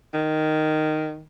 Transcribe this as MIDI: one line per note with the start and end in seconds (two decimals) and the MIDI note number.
0.14 1.24 51